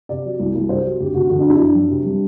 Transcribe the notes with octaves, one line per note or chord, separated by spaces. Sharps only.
C3 D5
F#3
C2
C2
C3 C5
F#3
D2 G4
D2 F#4
D3 F#4
D4
F#3 E4
F#2 D4
F#2
C3
G3